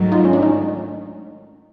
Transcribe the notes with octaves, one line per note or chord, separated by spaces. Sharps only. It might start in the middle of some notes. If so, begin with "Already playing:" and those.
Already playing: G#2 D#3 F#3 A3
D#4 F4
C#4
D4
C#4 D#4